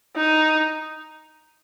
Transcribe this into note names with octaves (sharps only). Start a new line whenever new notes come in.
D#4